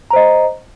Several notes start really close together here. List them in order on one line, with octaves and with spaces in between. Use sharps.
A#5 C5 D#5